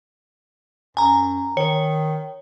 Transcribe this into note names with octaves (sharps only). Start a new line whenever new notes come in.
F#2 G#5 A#5
D#3 C#5